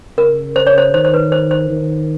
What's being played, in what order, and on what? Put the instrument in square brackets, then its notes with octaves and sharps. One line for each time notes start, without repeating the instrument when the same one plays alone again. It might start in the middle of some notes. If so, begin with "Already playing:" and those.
[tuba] C#3 [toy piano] A#4
[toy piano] C5
C#5
C5
[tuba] D#3 [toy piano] C5
[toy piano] C5
B4
C5
C5
[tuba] D#3